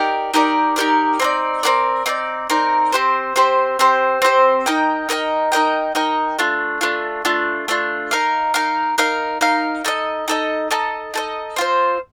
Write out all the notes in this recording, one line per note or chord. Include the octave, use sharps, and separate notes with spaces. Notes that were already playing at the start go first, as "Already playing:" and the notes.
Already playing: D#4 G4 A#4 D5
D#4 G4 A#4 D5
D#4 G4 A#4 D5
C4 D#4 A#4 D5
C4 D#4 A#4 D5
C4 D#4 A#4 D5
C4 D#4 A#4 D5
C4 G4 C5
C4 G4 C5
C4 G4 C5
C4 G4 C5
D#4 A#4 D#5 G5
D#4 A#4 D#5 G5
D#4 A#4 D#5 G5
D#4 A#4 D#5 G5
A3 D4 F4
A3 D4 F4
A3 D4 F4
A3 D4 F4
D#4 A#4 F5
D#4 A#4 F5
D#4 A#4 F5
D#4 A#4 F5
D#4 A4 D#5
D#4 A4 D#5
D#4 A4 D#5
D#4 A4 D#5
C4 F4 C5